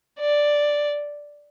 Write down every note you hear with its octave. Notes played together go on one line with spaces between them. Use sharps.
D5